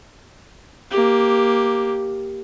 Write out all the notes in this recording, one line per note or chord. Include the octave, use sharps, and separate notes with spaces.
A#3 G4